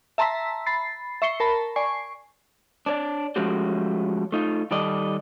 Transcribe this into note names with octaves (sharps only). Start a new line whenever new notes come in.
E5 A5 A#5 C6 E6 B6
B5 A6 C7
E5 C#6 C7 C#7 G7
A#4 A5 B5
D5 G#5 C#6 C7
D4 C#5 D5
F3 G#3 A3 C#4 F#4 G4
A3 D#4 F4
D#3 G3 A4 D5 D#5